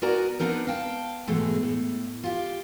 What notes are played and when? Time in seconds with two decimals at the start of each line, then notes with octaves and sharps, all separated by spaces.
0.02 B3 F#4 A#4 D5 G#5 A#5
0.39 B3 C4 D4 D#4 A#4
0.67 F5 G5 A5
1.27 G#2 B2 E3 G#3 A3
1.63 A2
2.23 F4 G4